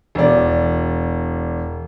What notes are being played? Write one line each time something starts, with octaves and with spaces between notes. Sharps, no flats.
E1 D5